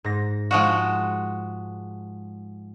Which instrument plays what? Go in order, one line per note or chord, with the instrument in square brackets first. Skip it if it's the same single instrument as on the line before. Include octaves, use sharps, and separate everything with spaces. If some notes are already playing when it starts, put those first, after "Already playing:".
[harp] G#2 A#6
[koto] F3 G#3 F#4